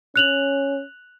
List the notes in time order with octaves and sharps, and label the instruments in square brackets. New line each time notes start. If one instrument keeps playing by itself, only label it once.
[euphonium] C#4 [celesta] F#6 F7 F#7